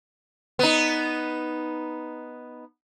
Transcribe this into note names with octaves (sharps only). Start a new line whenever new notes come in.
B3 D#4